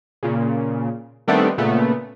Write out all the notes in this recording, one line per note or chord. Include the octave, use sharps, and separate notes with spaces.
A#2 C#3
D#3 G3 A3 B3 C4 D4
A#2 C#3 A3 B3